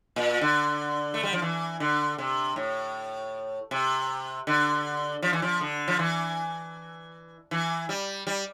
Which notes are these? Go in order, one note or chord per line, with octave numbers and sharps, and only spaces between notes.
A#2
D3
A3
G3
F3
E3
D3
C3
A2
C3
D3
F3
E3
F3
D3
F3
E3
E3
G3
G3